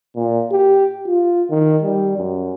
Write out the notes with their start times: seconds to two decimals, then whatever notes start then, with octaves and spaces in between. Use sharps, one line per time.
0.16 A#2
0.51 G4
1.07 F4
1.50 D#3
1.82 G3
2.18 F#2